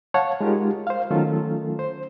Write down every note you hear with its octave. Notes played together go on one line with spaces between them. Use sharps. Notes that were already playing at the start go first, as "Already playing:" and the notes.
C#5 F5 F#5 A5
G#3 D#4 F4 G4 A#4
C5 F5
D#3 F#3 A3 C#4 F4 A4
C5